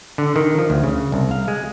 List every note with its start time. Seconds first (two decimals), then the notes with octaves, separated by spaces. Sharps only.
0.18 D3
0.36 D#3
0.58 F3
0.70 D2
0.84 C#3
1.12 C2
1.31 F5
1.48 G#3